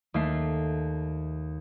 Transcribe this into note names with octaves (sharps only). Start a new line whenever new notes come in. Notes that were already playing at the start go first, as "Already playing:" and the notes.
D#2 A3 C7